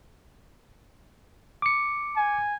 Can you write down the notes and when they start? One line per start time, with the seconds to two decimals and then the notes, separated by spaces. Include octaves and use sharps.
1.62 D6 C#7
2.17 G#5